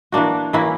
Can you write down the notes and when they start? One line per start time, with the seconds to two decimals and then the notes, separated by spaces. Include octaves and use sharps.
0.12 E3 A#3 D4 F#4
0.53 E3 A#3 C#4 E4